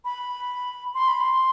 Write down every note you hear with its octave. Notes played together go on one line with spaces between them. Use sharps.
B5
C6
B5
C6